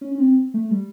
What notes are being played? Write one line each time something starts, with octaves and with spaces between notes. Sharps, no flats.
C#4
C#4
C4
A3
G3